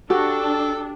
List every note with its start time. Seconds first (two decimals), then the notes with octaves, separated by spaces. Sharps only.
0.10 D4 F#4 G4 A4